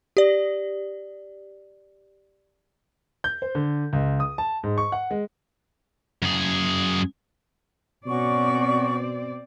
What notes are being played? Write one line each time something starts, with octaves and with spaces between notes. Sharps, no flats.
G4 D5
G6
C5
D3
C#2
D#6
A5
G#2
C#6
F#5
G#3
F#2 G#4
B2 C4 C#4 F#4 D5 C#6